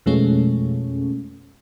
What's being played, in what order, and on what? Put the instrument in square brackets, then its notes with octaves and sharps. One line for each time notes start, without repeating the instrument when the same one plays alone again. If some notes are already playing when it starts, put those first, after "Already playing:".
[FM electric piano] F2 B2 F3 G#3 A3 C#4